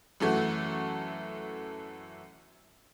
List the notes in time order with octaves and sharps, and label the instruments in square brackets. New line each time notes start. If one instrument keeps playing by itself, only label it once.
[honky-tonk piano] F#2 E3 A3 F#4